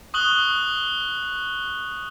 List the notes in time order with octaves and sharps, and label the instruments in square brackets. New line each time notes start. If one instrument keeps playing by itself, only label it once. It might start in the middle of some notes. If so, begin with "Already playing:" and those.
[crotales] C#6 D#6 F#6 F#7 G7